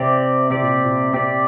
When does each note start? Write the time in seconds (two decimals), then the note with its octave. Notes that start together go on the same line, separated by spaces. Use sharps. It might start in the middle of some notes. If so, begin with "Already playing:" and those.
Already playing: C3 C4 G4 D5
0.50 C3 C4 G4 D5
0.62 A#2
0.84 A#2
1.13 C4 G4 D5